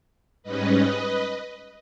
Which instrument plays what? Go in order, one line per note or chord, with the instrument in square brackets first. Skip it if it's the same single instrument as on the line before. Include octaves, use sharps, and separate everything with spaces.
[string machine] G#2 G3 C#4 B4 D#5